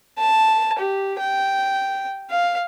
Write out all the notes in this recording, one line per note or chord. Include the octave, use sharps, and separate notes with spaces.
A5
G4
G5
F5